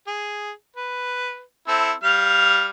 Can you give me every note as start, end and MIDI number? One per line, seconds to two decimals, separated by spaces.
0.07 0.51 68
0.76 1.41 71
1.68 1.92 60
1.68 1.92 64
1.68 1.92 69
2.03 2.70 55
2.03 2.70 77
2.03 2.70 89